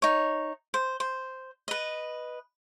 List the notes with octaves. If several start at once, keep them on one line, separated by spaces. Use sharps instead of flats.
D#4 C#5
C5
C5
B4 D#5